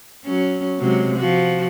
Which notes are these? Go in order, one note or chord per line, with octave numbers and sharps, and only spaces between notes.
F#3 C#4
C3 F#3 G#3
F3 F#4